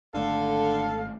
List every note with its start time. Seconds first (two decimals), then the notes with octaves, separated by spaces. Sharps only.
0.15 G#1 D3 A3 A4 F5